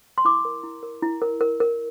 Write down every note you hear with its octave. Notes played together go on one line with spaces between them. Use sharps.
C6
E4 D6
A#4
E4
A#4
E4
A#4
A#4
A#4